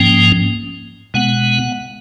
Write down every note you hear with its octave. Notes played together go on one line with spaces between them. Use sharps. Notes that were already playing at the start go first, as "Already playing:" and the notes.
Already playing: G#2 F3 A#3 C#4 G5
B2 G#3 B3 F#5